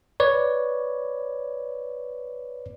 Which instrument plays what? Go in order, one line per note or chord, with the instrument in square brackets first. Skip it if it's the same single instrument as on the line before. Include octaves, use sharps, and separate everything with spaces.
[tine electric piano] B4 C#5 D5